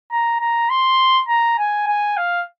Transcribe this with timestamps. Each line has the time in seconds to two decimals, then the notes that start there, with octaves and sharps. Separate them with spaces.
0.11 A#5
0.41 A#5
0.70 C6
1.29 A#5
1.58 G#5
1.87 G#5
2.17 F5